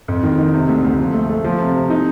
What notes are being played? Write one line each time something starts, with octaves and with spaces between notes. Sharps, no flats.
F2
D#3
D#4
C3
D2
D2
F3
A3
A3
F3
C3
C3
D#4